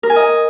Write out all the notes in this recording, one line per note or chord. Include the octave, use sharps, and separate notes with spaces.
A#4
G#5
D#5